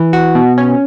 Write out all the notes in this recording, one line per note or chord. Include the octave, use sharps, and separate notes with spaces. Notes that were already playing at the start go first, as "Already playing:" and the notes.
Already playing: E3
F#4
B2
C#4